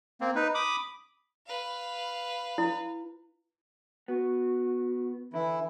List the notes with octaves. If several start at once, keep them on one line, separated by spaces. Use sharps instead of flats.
A#3 C4
D#4 B4
B5 D6 D#6
B4 F5
E4
B3 F#4
D3 E3 E4